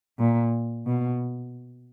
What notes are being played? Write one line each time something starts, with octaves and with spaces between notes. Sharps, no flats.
A#2
B2